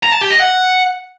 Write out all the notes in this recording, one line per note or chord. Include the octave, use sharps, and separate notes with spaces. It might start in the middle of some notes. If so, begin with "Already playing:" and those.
A#5
A5
G4
D#5
F#5